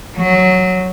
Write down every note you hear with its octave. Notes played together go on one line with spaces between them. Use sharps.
F#3